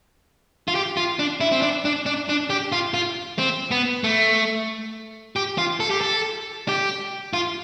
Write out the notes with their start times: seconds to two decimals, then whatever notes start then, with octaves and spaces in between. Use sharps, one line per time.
0.68 F4
0.75 G4
0.97 F4
1.19 D4
1.40 E4
1.52 C4
1.62 D4
1.85 D4
2.06 D4
2.29 D4
2.50 G4
2.72 F4
2.94 F4
3.39 C4
3.71 B3
4.04 A3
5.36 G4
5.58 F4
5.80 A4
5.90 G4
6.01 A4
6.68 G4
7.33 F4